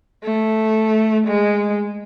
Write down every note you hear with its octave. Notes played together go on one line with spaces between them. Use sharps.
A3
G#3